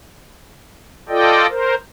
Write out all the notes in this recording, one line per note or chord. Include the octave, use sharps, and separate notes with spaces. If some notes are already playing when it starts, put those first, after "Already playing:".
F4 A4 D5 D#5 G5
A#4 C5